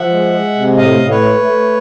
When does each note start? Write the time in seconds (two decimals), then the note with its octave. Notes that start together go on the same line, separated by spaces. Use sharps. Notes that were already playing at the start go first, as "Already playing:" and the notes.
Already playing: F3 E5 F#5
0.10 G#3
0.33 G#3
0.55 C3
0.77 A2 D#5 F5
0.99 A2
1.10 B4 C#5
1.21 A3
1.43 A3